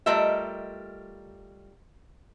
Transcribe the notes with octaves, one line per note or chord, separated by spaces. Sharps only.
G3 A3 F4 A#4 D#5 E5